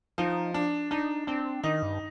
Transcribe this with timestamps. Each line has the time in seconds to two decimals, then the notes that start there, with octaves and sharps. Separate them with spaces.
0.18 F3 D#4
0.54 D4
0.91 D4 D#4
1.27 C4 D4
1.64 D#3 D#4
1.83 G2